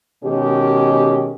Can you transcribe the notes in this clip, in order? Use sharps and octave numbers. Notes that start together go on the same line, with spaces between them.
B2 D#3 G#3 C#4 G4